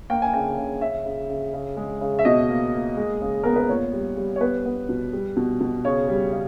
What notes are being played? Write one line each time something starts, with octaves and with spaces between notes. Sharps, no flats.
A#3 G5
G#5
C#3 G5
C#3
C#3 E5
C#3
C#3
C#3
G#3
C#3
E5
B2 D#5
A#3
A#3
G#3
C#3
B3 A#4
B4
A#2 C#5
G3
G3
C#5
B3 B4
B3
B2
G3
B2
B2
C#3 C#5
G3
C#3